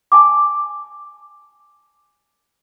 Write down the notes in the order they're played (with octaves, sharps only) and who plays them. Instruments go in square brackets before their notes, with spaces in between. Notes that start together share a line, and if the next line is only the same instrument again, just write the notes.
[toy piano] G#5 A5 D6